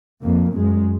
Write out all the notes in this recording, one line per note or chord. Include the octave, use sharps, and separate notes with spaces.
F2 A#3
F#2 G#3